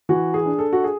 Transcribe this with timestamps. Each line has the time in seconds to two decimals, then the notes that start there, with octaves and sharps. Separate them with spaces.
0.09 E3 F#4
0.34 G#4
0.46 D4
0.59 A4
0.73 F#4
0.84 G#4